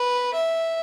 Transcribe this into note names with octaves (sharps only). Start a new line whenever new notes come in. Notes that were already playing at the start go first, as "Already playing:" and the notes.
Already playing: B4
E5